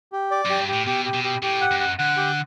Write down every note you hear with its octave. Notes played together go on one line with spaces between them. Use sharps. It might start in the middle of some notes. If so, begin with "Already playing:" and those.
G4
D5
F#2 G4
G2
G4
A2
B2 G4
G4
B2
G4
A2 G4
F#5
F#2
F#5
D3 F#5
G4